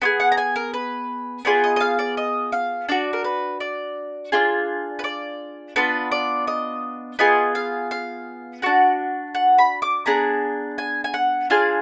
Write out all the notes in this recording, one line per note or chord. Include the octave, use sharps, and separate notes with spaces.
B3 F4 G#4
F#5
A#5
G#5
A#4
B4
B3 F4 G#4 D5
D#5
D#5
F5
D5
D#5
F5
D4 F#4 D5
A#4
B4
D5
D4 F4 G#4
B4
D5
B3 D4 F4 B4
D5
D#5
B3 F4 G#4 D#5
F5
F5
D4 F#4 F#5
F#5
B5
D6
B3 D4 G#4 A#5
G#5
G#5
F#5
D4 F4 G#4 F5